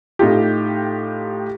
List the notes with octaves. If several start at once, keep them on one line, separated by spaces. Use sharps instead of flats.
A2 D#4 F4 G4